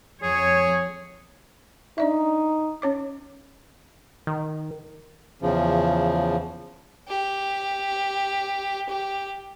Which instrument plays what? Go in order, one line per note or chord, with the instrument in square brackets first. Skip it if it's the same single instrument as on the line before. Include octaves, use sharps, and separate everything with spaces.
[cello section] F2 C#5 [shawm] G#4
[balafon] D4 D5 E5 [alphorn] D#4
[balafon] C#4 C#5 D6
[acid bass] D#3
[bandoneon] E2 C#3 F3
[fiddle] G4
G4